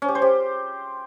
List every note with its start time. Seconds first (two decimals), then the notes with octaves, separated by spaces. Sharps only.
0.02 C#4
0.08 G4
0.15 C5
0.22 G4